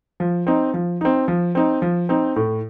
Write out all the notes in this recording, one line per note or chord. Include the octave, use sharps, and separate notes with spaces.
F3
C4 D#4
F3
C4 D#4
F3
C4 D#4
F3
C4 D#4
A2